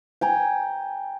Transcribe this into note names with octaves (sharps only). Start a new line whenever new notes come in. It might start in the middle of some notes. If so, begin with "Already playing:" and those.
G5 G#5 A#5